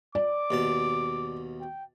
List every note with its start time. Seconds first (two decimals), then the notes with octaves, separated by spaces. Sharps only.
0.15 D5 D6
0.51 D#2 B2 A5
1.60 G5